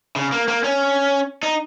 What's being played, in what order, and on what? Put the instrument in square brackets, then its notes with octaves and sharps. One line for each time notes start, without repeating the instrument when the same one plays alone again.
[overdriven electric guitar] C#3
A#3
A#3
C#4
D#4